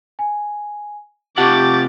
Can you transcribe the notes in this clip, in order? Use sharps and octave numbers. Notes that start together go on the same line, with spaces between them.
G#5
C3 F4 G4 F#5 A5 C#6 D6 A6